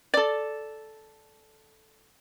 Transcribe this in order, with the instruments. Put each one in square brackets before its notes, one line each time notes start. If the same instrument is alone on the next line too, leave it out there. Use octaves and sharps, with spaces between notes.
[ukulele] A4 D5